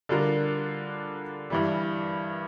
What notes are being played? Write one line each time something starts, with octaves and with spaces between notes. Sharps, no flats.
D3 G3 D4 F4 A#4
G2 E3 G3